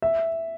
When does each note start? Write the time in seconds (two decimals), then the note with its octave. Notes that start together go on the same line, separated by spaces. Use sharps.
0.02 E5